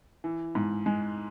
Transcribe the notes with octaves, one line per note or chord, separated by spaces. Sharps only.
E3
G#2
G#3